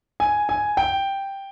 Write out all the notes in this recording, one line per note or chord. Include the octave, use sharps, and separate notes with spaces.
G#5
G#5
G5